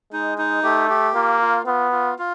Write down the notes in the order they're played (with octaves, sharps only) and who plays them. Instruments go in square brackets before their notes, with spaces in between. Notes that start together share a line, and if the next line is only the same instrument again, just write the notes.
[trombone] G#3 [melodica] D#4
[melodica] D#4
[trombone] A3 [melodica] G4
[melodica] G4
[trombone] A#3 [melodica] F4
[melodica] F4
[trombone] B3 [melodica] F4
[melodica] F4
F4